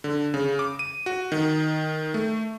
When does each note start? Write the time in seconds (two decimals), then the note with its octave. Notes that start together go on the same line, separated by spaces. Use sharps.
0.04 D3
0.34 C#3
0.59 D6
0.79 D#7
1.06 F#4
1.32 D#3
2.14 A3